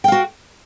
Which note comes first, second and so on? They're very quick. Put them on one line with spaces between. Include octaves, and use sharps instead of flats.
G5 F5 F#4